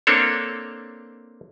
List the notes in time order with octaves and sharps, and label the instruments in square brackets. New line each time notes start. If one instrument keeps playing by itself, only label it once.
[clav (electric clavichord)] A#3 C4 D4 A4 C#5